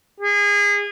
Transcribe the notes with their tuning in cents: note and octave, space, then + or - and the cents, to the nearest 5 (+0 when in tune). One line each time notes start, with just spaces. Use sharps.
G#4 -30